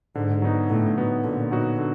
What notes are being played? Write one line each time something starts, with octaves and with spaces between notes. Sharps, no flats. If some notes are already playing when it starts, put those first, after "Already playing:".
G#2 D3
F#3 B3 D#4 F#4
A2 D3
F#3 B3 D#4 F#4
A#2 D3
F#3 B3 D#4 F#4
D3